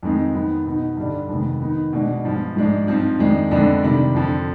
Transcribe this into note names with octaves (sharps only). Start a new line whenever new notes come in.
F2 D#3 G#3 C4 D#4
F2 D#3 B3 D#4
B2 B3 D#4
G2 D3 G3 D4
F2 C3 D#3 G#3 B3
D#3 B3 D#4
B2 G#3 D4
G2 F3 G#3 B3
G#2 F3 G#3 D4
G2 F3 C4 D#4
F2 D#3 G#3 D4
F2 D3 G#3 B3 D4
C3 D#3 G3 D4
F2 D3 F3